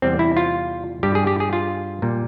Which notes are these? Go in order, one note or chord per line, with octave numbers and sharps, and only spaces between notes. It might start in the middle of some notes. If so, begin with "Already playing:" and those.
E2 C3 G3 C4
E4
F4
G2 G3 G4
G#4
G4
G#4
F4
A#2 G3